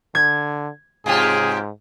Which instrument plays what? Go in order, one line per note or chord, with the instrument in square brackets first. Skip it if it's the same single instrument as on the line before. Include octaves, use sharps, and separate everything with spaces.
[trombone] D3 [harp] G#6
[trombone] G#2 [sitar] C3 F4 G4 [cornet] G#4